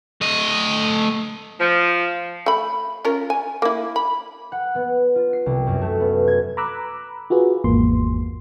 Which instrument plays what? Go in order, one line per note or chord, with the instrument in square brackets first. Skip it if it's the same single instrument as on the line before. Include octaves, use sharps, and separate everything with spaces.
[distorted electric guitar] A3 D#5
[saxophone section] F3
[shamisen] A3 B5
C#4 F4 A#4
G#5
A#3 E4
B5
[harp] F#5
B3
F4
C7
C2
F#2
A3
B3
G#6
[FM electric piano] A#5 B5 D6 E6 F#6
F4 F#4 G#4 B4
G#1 E2 G#2 A#3 C6